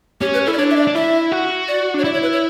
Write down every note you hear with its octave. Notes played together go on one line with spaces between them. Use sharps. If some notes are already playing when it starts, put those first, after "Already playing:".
C#4 G4
B4
E4 A4
D5
D4 C#5
E5
D5
D4
E4 E5
F#4
D5
D4 C#5
E4 D5
C#5
B4
C#5